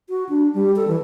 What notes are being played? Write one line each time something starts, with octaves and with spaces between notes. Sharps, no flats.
F#4
D4
G3
A4
E3